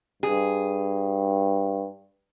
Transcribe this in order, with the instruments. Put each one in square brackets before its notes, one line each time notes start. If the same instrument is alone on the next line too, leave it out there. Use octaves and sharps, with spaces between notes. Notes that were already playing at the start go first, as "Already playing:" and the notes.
[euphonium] G2 [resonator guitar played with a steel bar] G#4